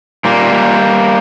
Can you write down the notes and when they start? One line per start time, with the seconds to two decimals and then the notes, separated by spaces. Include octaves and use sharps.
0.25 A#2 G3 A#3
0.53 A#2